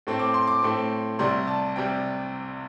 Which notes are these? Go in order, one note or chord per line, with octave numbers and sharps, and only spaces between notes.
A2 A3 C4
D6
C6
D6
A2 A3 C4
C2 C3 G3 C6
A5
C3 G3 G5